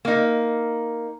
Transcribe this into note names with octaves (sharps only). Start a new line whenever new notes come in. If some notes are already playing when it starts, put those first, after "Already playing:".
A#3 D#4